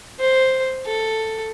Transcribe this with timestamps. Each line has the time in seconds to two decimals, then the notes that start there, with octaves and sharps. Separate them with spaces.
0.20 C5
0.86 A4